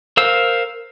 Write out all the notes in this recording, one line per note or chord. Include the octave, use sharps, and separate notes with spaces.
A#4 C5 F5 E6